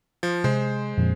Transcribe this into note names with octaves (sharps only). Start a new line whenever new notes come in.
F3
C3 G#3 C5
F2 A#2 F3